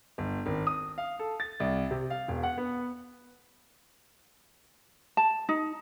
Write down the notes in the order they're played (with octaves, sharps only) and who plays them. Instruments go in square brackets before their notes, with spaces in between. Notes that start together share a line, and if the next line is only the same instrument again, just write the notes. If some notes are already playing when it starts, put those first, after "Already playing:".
[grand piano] G1
G#1
D#6
F5
A4
A6
C2
C3
F5
E1
F#5
B3
[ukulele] A5
D#4